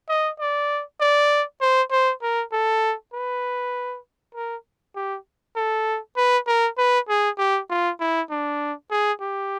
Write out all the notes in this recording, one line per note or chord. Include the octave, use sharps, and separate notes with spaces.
D#5
D5
D5
C5
C5
A#4
A4
B4
A#4
G4
A4
B4
A#4
B4
G#4
G4
F4
E4
D4
G#4
G4